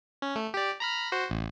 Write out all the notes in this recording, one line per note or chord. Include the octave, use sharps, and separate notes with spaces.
C#4
A3
G4 D5
A#5 B5 F6
F#4 C5
A1